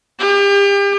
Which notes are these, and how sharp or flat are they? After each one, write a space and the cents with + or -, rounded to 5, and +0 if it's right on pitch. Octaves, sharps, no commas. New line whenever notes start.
G4 +35